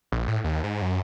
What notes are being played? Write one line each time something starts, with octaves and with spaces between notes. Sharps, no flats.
A#1
A2
D#2
G#2
F#2